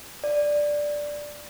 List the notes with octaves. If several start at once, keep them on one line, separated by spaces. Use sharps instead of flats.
D5